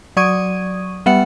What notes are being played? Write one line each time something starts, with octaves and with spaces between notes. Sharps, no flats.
F#3 D5 C#6 D#6 G#6 D#7
G3 B3 E5 F#5 C#7